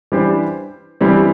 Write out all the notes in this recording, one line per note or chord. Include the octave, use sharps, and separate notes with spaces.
E3 G3 D4 G4 C5
G2 E3 G3 C4 G4